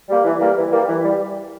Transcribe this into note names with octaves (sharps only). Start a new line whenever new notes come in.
G3 A#3
E3
G3 A#3
E3
G3 A#3
E3
G3